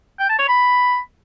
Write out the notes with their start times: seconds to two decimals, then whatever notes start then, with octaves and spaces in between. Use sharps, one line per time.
0.20 G5
0.29 A5
0.39 C#5
0.48 B5